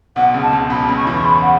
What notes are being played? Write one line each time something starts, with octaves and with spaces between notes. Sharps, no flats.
B1 B2 F#5
C#2 C#3
A5
C#2 C#3
B1 B2 B5
C#2 C#3
C#6
E2 E3
C#6
B5
F#5